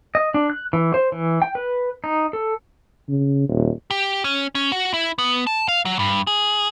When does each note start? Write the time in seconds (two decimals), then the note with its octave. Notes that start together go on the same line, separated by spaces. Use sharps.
0.15 D#5
0.34 D4
0.50 F#6
0.73 E3
0.94 C5
1.12 E3
1.42 G5
1.55 B4
2.04 D#4
2.33 A4
3.08 C#3
3.49 D#1
3.90 G4
4.24 C#4
4.55 C#4
4.72 F#4
4.94 E4
5.18 B3
5.47 A5
5.68 F5
5.85 F#3
5.99 G2
6.27 G#4